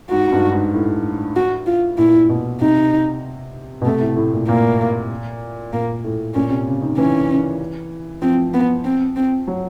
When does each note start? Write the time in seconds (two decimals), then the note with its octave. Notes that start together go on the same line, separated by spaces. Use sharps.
0.10 G#2 F#4
0.27 G#2
0.32 G2
0.52 G#2
0.74 A2
1.36 F#4
1.67 F4
1.98 A#2 E4
2.29 B2
2.61 C3 D#4
3.81 B2
3.85 C3 A3
4.01 A2
4.17 A2
4.33 A#2
4.48 A#2 A#3
5.73 A#2 A#3
6.04 A2
6.35 A#2 C#4
6.50 C3
6.66 C#3
6.82 D#3
6.98 E3 C#4
8.22 F3 C4
8.54 B3
8.85 C4
9.16 C4
9.47 F#3